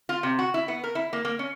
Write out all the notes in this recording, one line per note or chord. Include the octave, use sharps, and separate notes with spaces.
F4
C3
F#4
E4
B3
A#4
E4
A#3
A#3
C#4